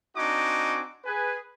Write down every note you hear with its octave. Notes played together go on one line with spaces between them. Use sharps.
C4 D4 D#4 F#4 G#5 D6
G#4 B4 G#5